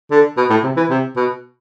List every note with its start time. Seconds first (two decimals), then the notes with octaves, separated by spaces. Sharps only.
0.11 D3
0.37 B2
0.50 A2
0.64 C3
0.77 E3
0.90 C3
1.16 B2